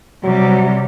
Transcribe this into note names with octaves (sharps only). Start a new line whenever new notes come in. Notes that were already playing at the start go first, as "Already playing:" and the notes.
C3 F#3 G3